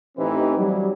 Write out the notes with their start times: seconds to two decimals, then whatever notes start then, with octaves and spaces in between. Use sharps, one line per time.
0.18 A1 E3 C4 D#4 G4 B4
0.58 F#3 G3